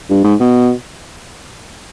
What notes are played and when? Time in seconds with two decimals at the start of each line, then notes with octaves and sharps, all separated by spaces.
0.10 G2
0.24 G#2
0.40 B2